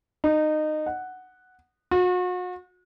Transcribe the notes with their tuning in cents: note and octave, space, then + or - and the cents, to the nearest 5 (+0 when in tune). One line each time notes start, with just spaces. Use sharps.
D#4 -20
F#5 +0
F#4 -40